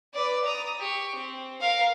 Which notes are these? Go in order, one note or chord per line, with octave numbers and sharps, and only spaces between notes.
B4 D5
A#5 D#6
G4 C#6
C4
A#4 F5